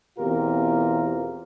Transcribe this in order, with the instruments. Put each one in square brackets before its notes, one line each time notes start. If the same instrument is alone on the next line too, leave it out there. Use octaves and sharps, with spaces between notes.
[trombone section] E2 B2 C4 F4 G4 A#4